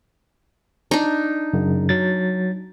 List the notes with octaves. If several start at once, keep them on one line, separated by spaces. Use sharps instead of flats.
D4 D#4
F#2 C#3
F#3 A6